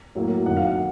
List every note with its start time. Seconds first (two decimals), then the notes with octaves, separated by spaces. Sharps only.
0.15 A2 F#3 A#3
0.46 F#2 D#3 F#3 F#5
0.57 F5
0.67 F#5